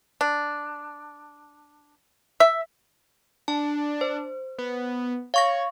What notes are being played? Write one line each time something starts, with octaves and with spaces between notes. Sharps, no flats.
D4
E5
D4 A5
C5
B3
C#5 F5 C#6 A#6